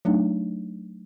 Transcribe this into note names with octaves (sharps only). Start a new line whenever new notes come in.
F#3 A3 D4 D#4